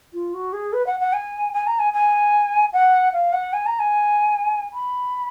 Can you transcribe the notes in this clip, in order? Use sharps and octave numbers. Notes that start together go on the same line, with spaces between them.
F4
F#4
G#4
B4
F#5
F#5
G#5
G#5
A#5
G#5
G#5
F#5
F5
F#5
G#5
A#5
G#5
B5